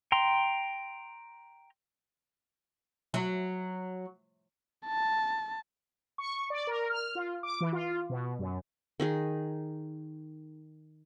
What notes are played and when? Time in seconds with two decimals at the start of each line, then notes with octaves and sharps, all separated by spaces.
0.12 G5 A#5 C6
3.14 F#3
4.87 A5
6.18 C#6
6.50 D5
6.67 A#4
6.90 F6
7.15 F4
7.43 D6
7.60 E3
7.73 F4
8.10 B2
8.39 F#2
9.00 D#3 D#4 G#4